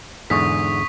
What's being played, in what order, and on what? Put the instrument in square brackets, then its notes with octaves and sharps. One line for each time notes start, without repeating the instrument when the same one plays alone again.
[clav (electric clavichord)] E2 G#2 D3 [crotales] C#6 D#6 B6